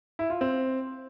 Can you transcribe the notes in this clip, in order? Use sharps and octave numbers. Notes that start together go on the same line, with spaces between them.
E4
F4
C4